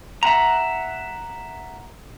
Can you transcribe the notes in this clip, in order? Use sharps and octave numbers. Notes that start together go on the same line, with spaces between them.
E5 F#5 A#5